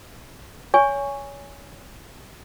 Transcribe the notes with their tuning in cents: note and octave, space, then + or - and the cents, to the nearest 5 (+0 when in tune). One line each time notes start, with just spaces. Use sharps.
C#5 +25 G#5 -10 C#6 +0